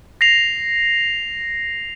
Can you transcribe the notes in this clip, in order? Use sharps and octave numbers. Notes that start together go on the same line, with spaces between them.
A#6 C7 F7